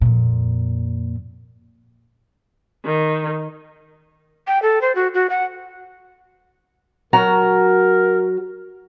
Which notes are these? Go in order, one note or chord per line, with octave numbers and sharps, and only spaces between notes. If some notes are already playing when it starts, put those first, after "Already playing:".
F2 A#2
D#3
G5
A4
C5
F#4
F#4
F#5
F#3 F#4 A#4 A#5